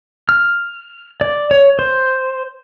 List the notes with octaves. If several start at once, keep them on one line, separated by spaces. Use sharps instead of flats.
F6
D5
C#5
C5